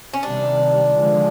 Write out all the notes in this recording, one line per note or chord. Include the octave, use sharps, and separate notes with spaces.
C#4
C3 D#3 G3 D4
D3 F3 G#3